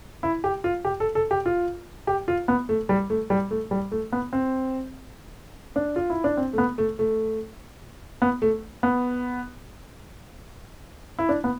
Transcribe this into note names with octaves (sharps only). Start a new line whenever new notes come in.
E4
G4
F4
G4
A4
A4
G4
F4
G4
F4
B3
A3
G3
A3
G3
A3
G3
A3
B3
C4
D4
F4
E4
D4
C4
A3
B3
A3
A3
B3
A3
B3
E4
D4
B3